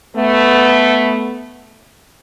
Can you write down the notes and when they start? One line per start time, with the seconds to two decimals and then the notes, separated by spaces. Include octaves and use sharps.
0.17 A3 B3